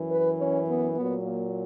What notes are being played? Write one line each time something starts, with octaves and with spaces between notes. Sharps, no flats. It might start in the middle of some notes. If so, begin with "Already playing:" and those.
Already playing: F#2 E3
B4
C#4
B3
A#2 F#3 B3
A#3